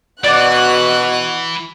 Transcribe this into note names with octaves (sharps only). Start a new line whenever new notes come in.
B2 E3 F#4 D5 F#6